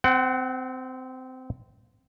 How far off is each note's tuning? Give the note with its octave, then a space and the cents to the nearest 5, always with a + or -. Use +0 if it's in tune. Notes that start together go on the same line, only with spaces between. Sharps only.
C4 -20 F#5 +25